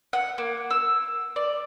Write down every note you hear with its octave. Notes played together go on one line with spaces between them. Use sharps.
F#5
A#3
E6
D5